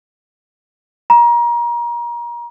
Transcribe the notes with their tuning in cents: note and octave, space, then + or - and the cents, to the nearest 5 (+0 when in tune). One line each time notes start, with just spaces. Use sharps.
A#5 +30